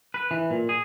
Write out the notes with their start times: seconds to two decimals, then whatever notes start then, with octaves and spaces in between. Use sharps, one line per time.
0.14 B4
0.31 E3
0.50 A#2
0.69 G#4